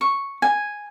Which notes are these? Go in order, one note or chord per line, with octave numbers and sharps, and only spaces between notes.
C#6
G#5